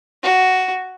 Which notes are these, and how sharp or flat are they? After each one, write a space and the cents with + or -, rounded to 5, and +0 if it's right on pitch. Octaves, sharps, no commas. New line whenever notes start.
F#4 +5